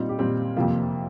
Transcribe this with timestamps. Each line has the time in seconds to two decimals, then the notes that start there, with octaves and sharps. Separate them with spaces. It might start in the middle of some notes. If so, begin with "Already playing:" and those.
Already playing: A#2 G3 C4 D#4 F4
0.09 G4
0.18 A#2 G3 C4
0.56 F2 C3 F3 A#3 F4